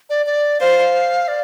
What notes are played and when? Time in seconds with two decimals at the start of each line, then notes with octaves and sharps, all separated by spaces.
0.10 D5
0.26 D5
0.60 C5 F5
1.28 D5